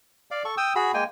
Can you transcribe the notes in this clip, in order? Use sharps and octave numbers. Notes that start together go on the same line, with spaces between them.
D5 F5
A4 C#6
G5 D#6 E6
F#4 G#4 B5
G#3 A#3 G5 G#5